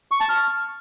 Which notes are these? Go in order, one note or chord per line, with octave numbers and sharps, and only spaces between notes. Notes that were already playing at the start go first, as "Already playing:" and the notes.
C#6
A5
F6